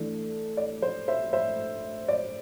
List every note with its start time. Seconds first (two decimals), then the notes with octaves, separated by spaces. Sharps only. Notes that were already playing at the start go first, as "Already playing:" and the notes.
Already playing: E3 A3 D4
0.57 D5
0.82 C5
1.08 C5 E5
1.33 C5 E5
2.08 D5